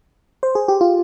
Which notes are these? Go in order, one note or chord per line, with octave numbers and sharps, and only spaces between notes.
C5
G#4
G4
F4